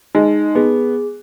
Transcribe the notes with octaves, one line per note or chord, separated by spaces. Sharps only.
G#3 D#4
B3 G#4